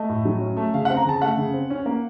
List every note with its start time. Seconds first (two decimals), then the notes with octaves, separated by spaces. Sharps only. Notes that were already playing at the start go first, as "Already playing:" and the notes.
Already playing: A3 D#5
0.09 A2
0.25 F#3
0.41 C#4
0.57 A3
0.74 C#3 F5
0.85 C4 F#5
0.97 A#5
1.05 C#3 A5
1.22 A3 F#5
1.37 C#3
1.54 C4
1.70 C#4
1.86 A#3